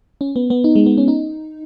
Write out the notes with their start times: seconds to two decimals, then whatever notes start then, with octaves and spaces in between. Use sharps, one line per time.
0.21 C#4
0.36 B3
0.50 B3
0.64 D#4
0.75 G#3
0.86 B3
0.98 C#4
1.08 D#4